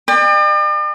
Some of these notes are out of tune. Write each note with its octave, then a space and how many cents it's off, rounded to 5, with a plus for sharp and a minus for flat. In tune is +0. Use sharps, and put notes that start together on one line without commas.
D5 +45 G5 +35